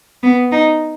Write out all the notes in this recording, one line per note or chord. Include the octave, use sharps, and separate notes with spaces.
B3
D#4